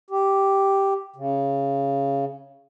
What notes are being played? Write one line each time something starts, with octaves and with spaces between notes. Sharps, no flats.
G4
C#3